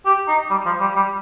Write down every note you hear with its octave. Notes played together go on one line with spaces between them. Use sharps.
G4
D#4
G3
F3
G3
G3